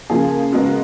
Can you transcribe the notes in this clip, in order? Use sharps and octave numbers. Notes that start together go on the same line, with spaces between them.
C#3 F3 A#3 G#4
C#3 G#3 B3 F#4 A#4